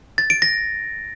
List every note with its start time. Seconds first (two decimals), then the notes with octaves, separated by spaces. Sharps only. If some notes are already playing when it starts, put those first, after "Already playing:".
0.18 A6
0.30 D7
0.42 A#6